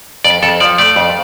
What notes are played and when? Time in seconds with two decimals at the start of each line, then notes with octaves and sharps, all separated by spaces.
0.24 F2 D5
0.43 F2 A4
0.60 F3 D5
0.78 A3 D5
0.96 F2